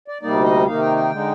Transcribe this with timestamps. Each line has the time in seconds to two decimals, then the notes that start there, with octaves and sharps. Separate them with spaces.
0.08 D5
0.22 D2 C3 G3 A#3 D#4 D5
0.44 D#5
0.66 C3 D#3 A#3 D#4 F5
0.82 G5
0.97 G5
1.11 D3 G#3 D#4